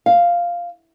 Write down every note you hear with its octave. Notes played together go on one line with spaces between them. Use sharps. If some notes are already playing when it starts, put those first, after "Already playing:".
F5